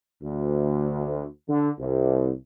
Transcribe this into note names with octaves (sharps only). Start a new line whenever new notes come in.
D2
D3
C2